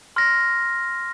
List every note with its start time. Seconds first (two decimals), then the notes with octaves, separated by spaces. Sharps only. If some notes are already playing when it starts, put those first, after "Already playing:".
0.16 C6 F6 A#6